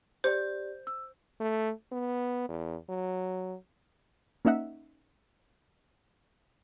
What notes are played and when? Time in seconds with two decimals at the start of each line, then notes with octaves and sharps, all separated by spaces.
0.24 G4 C5 D5
0.87 E6
1.40 A3
1.92 B3
2.49 E2
2.89 F#3
4.45 A#3 C#4 D#4 E5 F#5